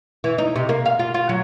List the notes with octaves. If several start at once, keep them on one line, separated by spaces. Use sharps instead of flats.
E3
D#4
C3
A#3
F5
F4
F4
F#3